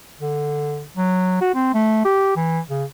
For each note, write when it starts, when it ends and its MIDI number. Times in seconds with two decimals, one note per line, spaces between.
0.20 0.85 50
0.97 1.38 54
1.41 1.54 66
1.55 1.71 60
1.74 2.02 57
2.05 2.32 67
2.36 2.59 52
2.70 2.84 49